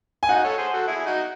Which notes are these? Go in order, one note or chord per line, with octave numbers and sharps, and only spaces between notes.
G#5
D#4 F#4 F#5
A4 C#5
G#4 C5
F#4 A4
E4 G#4
D#4 F#4